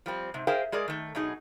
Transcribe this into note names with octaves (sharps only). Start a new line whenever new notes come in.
F3 G3 C4
G#2 C3
G#4 A#4 C5 E5 F5 G5
G#3 G#4 A#4 D5
D#3 A3
B2 F#3 D#4 G#4